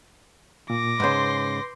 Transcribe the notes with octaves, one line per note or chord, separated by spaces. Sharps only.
A#2 D6 A#6
G#2 C#3 B4 C6 G6